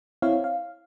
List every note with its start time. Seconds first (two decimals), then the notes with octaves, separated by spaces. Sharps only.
0.22 C4 E4 C#5 F5
0.44 F5